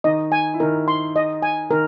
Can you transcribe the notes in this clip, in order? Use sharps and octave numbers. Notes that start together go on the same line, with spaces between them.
D#3 D#4 D#5
G#5
E4
D#3 D#4 A#4
C6
D#5
G#5
D#3 D#4 A#4